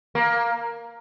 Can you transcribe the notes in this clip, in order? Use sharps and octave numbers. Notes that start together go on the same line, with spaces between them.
A#3